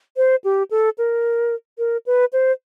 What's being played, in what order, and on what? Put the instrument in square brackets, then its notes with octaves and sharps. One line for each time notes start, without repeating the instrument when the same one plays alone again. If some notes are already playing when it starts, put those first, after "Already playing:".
[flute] C5
G4
A4
A#4
A#4
B4
C5